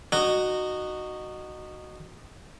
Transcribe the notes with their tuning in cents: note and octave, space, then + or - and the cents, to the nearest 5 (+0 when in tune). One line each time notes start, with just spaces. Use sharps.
D#4 -20 F#4 +0